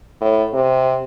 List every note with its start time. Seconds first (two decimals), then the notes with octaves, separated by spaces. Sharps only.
0.21 A2
0.53 C3